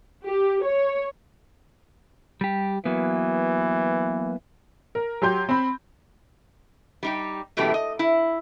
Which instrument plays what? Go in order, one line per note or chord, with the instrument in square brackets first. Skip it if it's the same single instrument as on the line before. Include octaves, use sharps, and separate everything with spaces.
[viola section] G4
C#5
[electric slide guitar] G3 G4
[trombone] E3 [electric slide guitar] F#3 A#3 B3
[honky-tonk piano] A#4
F#3 G4 C6 G6
C4 B5
[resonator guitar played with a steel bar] G3 D#4 G4
F#2 B2 E3 G#3 A3 G4
D#5
E4